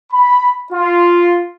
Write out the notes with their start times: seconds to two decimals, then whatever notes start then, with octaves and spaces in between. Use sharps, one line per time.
0.13 B5
0.73 F4